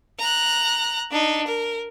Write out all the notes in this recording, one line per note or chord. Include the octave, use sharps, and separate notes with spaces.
A#5 F#6
D4 D#4
A#4